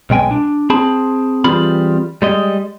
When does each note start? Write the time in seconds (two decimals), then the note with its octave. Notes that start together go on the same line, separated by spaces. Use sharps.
0.10 B1 B2 G#3 G5 G#5
0.31 D4
0.70 C4 G#4 A5 B5
1.44 E3 G3 C4 F4 G#4 B5
2.22 G3 G#3 D#5